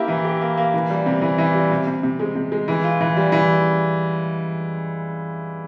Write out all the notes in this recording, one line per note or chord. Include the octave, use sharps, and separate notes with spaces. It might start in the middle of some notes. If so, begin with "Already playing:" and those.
Already playing: A#3 E4 G4
E3
G4
A#3
A#3
E3
G3
C3
E3
E3
G3
C3
C3
C3
G#3
C3
G#3
E3
F4
E3
G3
E3